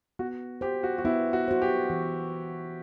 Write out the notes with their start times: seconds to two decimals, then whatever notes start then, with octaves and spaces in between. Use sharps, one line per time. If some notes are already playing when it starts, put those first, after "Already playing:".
0.19 B3 F#4
0.61 F#4 G4 C5
0.83 F#4
0.98 F#4
1.05 B3 E4
1.33 F#4
1.48 F#4 C5
1.62 G4
1.90 E3